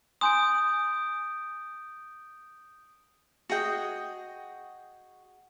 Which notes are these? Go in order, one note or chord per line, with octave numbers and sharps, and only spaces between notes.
G#5 A#5 C6 D#6 G6 D7
F#4 G#4 D#5 G5